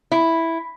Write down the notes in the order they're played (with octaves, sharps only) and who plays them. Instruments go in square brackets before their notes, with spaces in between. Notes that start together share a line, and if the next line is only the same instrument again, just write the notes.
[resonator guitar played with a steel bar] E4